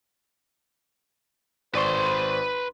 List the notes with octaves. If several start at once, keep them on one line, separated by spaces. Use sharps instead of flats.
G#1 B4 C5 D5 C6 C#6